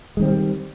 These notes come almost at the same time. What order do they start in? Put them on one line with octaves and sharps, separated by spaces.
G#3 D#3 C4 G3